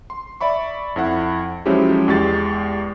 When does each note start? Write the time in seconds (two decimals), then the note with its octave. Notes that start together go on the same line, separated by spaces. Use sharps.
0.10 C6
0.41 D5 E5 B5 C#6
0.96 F2 E4 F#5
1.66 F3 F#3 G#3 C#4 E4 G4
2.08 E2 G#3 G4 C#6 A6